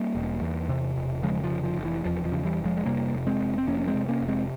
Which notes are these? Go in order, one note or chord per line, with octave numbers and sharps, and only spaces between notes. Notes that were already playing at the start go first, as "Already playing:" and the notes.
Already playing: G3 A#3
E1
E2
C3
E1
C#3 F3 G#3
F3
F1
F3
F1
E3
E2 F3
F3
C#3
E3 G3
F1
F3 G#3
G#3
C3 G3 A#3
F1
G#3 C4
F1
C4
F2 A#3 C#4
C#4
G#3 C4
C3
A#3 C#4
F1
G#3 C4